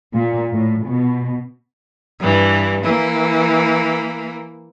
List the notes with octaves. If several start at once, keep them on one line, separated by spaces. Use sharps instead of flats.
A#2
A2
B2
G2 E3
E3 A#3